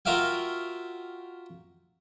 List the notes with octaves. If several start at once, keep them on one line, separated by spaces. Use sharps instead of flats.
F4 F#4 A#4 E5 F5 G5